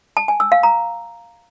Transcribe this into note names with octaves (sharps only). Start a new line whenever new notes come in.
A5
G#5
E6
F5
A#5